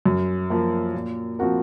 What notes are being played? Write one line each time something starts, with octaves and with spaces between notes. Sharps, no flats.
F#2
F3 A#3
A#2
F3 C4 F#4 A#4